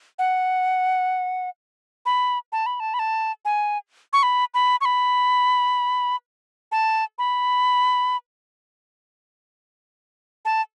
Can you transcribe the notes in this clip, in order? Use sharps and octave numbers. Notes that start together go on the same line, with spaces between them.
F#5
B5
A5
B5
A5
B5
A5
G#5
C#6
B5
B5
C#6
B5
A5
B5
A5